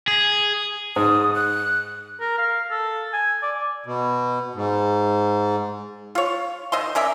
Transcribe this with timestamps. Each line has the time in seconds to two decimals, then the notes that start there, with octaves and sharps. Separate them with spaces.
0.08 G#4
0.96 G#2 D#6
1.35 F#6
2.20 A#4
2.38 F5
2.71 A4
3.13 G#5
3.42 D5
3.86 B2
4.55 G#2
6.15 F4 C#5
6.72 D#3 D#5 E5 C6
6.95 C#4 A#4 D5 E5